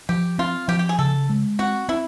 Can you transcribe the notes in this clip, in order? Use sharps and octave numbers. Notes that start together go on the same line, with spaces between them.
F3 G4
C4 F4
F3 G4
G4
G#4
C#3 A4
G#3
C4 F#4
C4 E4